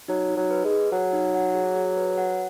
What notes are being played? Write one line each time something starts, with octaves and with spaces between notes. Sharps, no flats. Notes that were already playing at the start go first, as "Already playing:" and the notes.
F#3 D#4
D#4
F#3
B4
G#3
G#4
F#3 F#5
D#4
F#5
G#4
G#4
B4
F#5